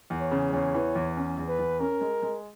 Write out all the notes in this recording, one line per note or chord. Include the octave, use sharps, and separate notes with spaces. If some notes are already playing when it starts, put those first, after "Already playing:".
E2
C#5
C#3
E2 C#5
E3
E2
C#4
E2
B4
E2
C#4 A#4
G#3
G#3